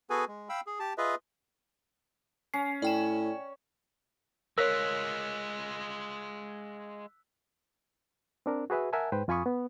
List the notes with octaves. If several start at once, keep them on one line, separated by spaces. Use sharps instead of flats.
B3 F#4 G#4 A4 B4 G#5
G#3
F5 G5 B5 E6
G#4
G4 A5
F4 G#4 B4 D#5 E5
C#4 C7
A2 D5 G5 E7
G#3 F4 A#4 C#5 E6 F#6 B6
C4 D4 A#4
F#4 G#4 B4 E5 G#5
A#4 E5 F#5 G#5 A5
G#2 B4 C5 G5
F2 F4 G#5 B5 C#6 D#6
B3